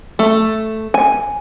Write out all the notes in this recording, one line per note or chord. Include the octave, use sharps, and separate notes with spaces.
A3
G#5